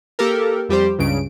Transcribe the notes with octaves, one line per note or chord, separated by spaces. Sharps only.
A#3 G4 A4 A#4
F2 G3 G4 C5
C#2 G2 C#3 D7